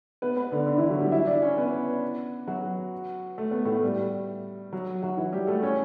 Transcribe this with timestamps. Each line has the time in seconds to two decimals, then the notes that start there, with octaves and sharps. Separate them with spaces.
0.22 B3 B4
0.37 B3 B4
0.52 D3 D4
0.66 D3 D4
0.78 E3 E4
0.89 F#3 F#4
1.00 G3 G4
1.12 E4 E5
1.27 D4 D5
1.42 C#4 C#5
1.57 B3 B4
2.47 F#3 F#4
3.38 A3
3.51 B3
3.65 A2 A3
3.83 G3
4.73 F#3
5.02 F#3 F#4
5.17 E3 E4
5.32 G3 G4
5.47 A3 A4
5.63 C#4 C#5